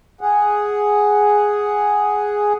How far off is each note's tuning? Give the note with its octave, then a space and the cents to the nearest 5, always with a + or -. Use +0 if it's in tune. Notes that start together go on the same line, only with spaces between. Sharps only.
G#4 +0 F#5 +0